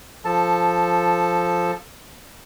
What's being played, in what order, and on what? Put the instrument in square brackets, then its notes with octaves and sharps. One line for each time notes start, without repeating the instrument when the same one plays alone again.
[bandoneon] F3 A4 A5